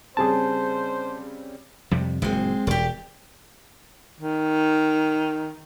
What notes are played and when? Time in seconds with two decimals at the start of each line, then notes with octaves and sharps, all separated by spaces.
0.17 C#3 G3 C4 G#4 C5 A5
1.91 F2 C3 G3
2.22 F#1 A#2 G#3 C4
2.67 E1 G4 D5
4.21 D#3